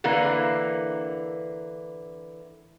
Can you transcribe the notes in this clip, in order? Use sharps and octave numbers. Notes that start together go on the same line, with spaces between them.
D3 E3 A#3 E4